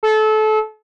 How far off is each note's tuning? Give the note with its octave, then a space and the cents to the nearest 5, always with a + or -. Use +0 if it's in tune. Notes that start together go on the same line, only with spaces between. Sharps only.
A4 -25